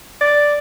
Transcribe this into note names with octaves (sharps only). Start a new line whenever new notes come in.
D5